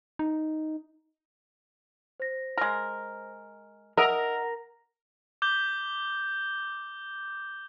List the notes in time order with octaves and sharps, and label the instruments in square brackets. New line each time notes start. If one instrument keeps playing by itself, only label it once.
[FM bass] D#4
[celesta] C5 A#6
[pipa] G#3 A#4
[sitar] A#4 [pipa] D#5 E5 [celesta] F#5 A#5
[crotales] D6 G6 G7